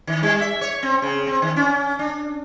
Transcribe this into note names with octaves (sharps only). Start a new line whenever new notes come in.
D#3
G3
E5
C#5
C4
C#3
C4
D#3
C#4
D4